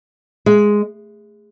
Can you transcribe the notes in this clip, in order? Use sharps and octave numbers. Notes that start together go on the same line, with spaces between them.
G#3